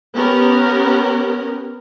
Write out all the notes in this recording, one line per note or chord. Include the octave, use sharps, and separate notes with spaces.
B3 C#4 G4 A#4